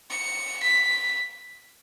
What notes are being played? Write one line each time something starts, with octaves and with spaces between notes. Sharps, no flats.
C#7
B6